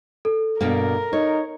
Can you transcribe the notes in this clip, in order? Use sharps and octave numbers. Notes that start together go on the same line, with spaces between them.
A4
G2 B2 A#3 A#4
D#4 C#5